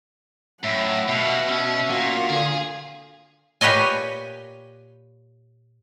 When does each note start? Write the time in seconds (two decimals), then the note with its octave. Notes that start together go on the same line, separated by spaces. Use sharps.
0.63 F#2 A2 E5 F#5
1.08 B2 G4 E5 F5
1.49 C#4
1.90 A#2 F#4 F5
2.30 D3 G#4
3.61 A#2 G4 B4 C#5 D#5 G#5